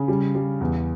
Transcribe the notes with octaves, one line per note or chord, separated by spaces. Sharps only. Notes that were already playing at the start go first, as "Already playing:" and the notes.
Already playing: C#3
G3
G3
E2